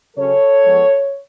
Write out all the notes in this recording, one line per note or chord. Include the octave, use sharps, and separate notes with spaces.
C#3 F#3 C#4 A4 C#5
F3 G#3 B3